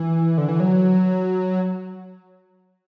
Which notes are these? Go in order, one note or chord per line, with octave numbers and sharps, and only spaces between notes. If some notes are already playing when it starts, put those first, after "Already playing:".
Already playing: E3
D3
E3
F#3